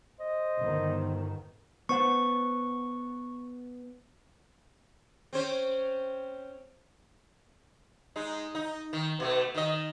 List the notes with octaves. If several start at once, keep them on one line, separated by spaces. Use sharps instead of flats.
C5 D#5
G1 D#3
B3 C5 F#5 C#6
C4 C#4 C5
G#3 D#4
D#4
D#3
B2 A3
D#3 D#5